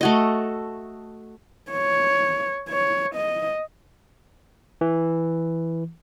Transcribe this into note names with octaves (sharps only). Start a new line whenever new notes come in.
A3 F#4 D#5
C#5
C#5
D#5
E3